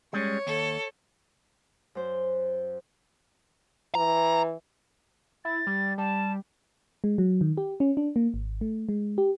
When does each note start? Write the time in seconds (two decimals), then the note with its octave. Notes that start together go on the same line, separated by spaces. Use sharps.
0.13 G3 G#3 C#4 C#5
0.47 D#2 A4
1.95 F#2 C5
3.95 E3 A#5
5.45 E4 A6
5.67 G3
5.98 G3 A5
7.04 G#3
7.18 F#3
7.41 D#3
7.57 G4
7.80 C#4
7.97 D4
8.16 A#3
8.34 G#1
8.61 A3
8.89 G#3
9.18 G4